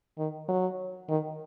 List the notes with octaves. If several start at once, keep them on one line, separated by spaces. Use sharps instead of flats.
D#3
F#3
D#3